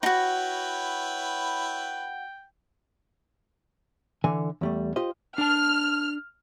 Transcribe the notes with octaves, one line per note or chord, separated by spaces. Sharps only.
D#4 E4 F#4 B4 C#5 F#5 G5
D3 E3 G#5
E2 G3 A3
F4 G4 C5 D#5
D4 A5 F6